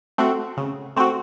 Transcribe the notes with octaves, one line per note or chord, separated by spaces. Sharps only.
A3 C4 F#4
C#3
A3 C4 F#4